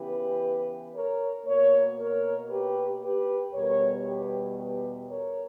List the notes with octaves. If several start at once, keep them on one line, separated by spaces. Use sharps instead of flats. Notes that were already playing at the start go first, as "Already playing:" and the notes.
Already playing: C#3 E3 B3 G4 B4
A#4 C#5
B2 A#3 A#4 C#5
A#4 C#5
G4 B4
G4 B4
E2 B2 G3 B3 A#4 C#5
G4 B4
G4 B4
A#4 C#5